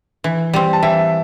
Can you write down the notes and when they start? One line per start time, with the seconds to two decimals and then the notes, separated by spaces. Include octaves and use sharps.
0.24 E3
0.53 G3 C4
0.73 A5
0.83 E3 E5 G5